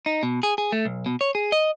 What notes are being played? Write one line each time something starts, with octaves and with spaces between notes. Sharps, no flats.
D#4
B2
G#4
G#4
A3
B1
B2
C#5
G#4
D#5